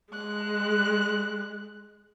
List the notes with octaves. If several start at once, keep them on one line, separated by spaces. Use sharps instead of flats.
G#3 F#6